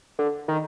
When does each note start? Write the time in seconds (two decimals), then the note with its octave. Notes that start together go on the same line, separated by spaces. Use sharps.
0.19 D3
0.48 D#3